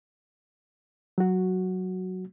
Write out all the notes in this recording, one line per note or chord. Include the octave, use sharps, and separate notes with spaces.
F#3 F#4